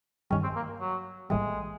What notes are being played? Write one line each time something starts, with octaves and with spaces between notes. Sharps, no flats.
G2 D#3 G3 C#4
C4
A#3
F#3
A#1 A2 E3 G3 G#3